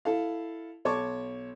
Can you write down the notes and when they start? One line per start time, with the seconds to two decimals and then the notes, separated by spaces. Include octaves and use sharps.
0.05 E4 A4 F5
0.85 B1 C#5 A5 C#6 D6